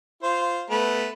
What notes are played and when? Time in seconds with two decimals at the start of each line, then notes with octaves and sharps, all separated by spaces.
0.23 F4 C5
0.70 A3 B3 B4